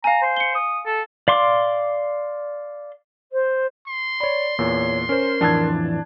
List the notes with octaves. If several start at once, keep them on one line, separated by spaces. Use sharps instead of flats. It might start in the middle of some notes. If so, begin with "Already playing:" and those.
F5 G#5 A#5
C5
C#7 G7
D#6
A4
D5 F5 C6 D6
C5
C6
C#5 D5 B5
E2 A#2 C#5
C#4 A#4 C5
F2 A2 E3 D4 A5 G#6